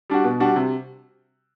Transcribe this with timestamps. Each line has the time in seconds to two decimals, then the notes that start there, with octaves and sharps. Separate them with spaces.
0.10 G3 D4 F#4
0.24 B2
0.40 G3 D4 F#4
0.56 C3